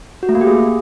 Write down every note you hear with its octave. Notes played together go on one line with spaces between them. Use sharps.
F#4
A3
A#3
G4
G#4